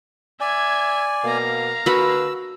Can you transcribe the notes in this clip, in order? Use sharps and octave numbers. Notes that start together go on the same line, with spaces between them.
D5 E5 G#5 G#6
B2 A#3 F5 A#5
D3 A#3 F#4 B4 B5 E6